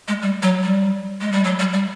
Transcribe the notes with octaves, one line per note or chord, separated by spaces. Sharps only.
G#3
G3
F#3
G3
G#3
G3
F#3
G3
G3